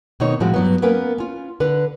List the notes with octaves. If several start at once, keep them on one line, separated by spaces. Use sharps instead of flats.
B2 D#3 C4 D#4 C#5
A2 F3 G#3 C4 F#4
G2 F#3 B3
A#3 B3 C#4 A#4 B4
C#4 F4
D3 B4